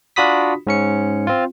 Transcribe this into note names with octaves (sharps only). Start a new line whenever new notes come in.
D4 F4 F#4 B5 D#6 B6
G#2 C#4 C#7
C4 F4